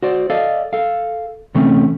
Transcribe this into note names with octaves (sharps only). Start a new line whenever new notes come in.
F#4 C5 D5
A4 D5 D#5 F5
A4 F5
C3 E3 A3 C4 C#4